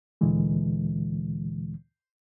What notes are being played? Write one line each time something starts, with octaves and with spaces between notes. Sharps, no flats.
D2 A#2 D3 E3 G#3